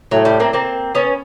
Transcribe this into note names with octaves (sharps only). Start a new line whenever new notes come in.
A2 F#3
G3
A#3 C4
A#3 C4
B3 C#4